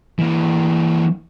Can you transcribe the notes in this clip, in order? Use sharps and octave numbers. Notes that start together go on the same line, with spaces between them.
E3 A#3